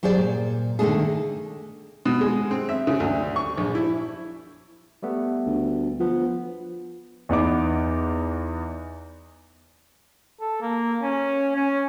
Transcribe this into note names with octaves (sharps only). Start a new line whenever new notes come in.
F#3 G4 G#4 C5 D5
A#2
D3 D#3 F#3 A3 D4 G#4
B2
G#3
C4
E5
C#3
D2
C#6
A#1
E4
G3 A3 B3
D2
F3 B3
E2 B3 D#4 D6
A4
A#3
C#4
C#4